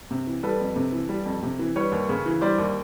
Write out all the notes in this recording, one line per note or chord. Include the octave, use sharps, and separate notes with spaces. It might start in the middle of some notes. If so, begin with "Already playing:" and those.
C3
E3
G3 A4 B4
F2
C3
E3
G3
F2
C3
E3
G3 B4 C#5
D#2
C#3
E3
G3 C5 D5
D#2